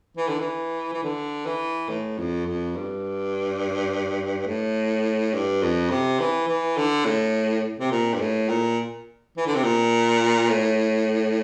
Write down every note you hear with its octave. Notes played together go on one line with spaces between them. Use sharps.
E3
D3
E3
E3
D3
E3
A2
F2
F2
G2
A2
G2
F2
C3
E3
E3
D3
A2
C3
A#2
G2
A2
A#2
E3
D3
C3
A#2
A2